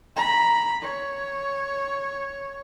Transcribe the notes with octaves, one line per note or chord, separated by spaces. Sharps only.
A#5 B5
C#5